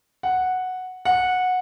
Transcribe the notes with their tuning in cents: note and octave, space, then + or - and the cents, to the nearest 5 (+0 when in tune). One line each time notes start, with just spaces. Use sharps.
F#5 -5
F#5 -15